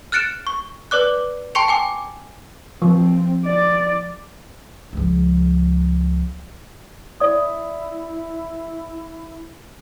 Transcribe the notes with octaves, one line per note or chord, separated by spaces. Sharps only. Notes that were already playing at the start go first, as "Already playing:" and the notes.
F6 F#6 A6 C#7 D7 E7
C#6
B4 D5 D6 F#6
G5 A5 C6 C#6 C#7 F7
G5 G#5 D6
F3 C4
D5
C#2 F3
E4 D5 D#6